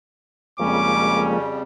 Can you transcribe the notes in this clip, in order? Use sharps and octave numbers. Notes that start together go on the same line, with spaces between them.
F2 C#3 F3 G3 G#3 A#3 C#4 D6